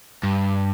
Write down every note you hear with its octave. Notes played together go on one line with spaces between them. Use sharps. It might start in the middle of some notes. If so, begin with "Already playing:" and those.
G2